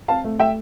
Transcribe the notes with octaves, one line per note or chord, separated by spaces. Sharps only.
C4 F5 A5
A3
A3 E5 G5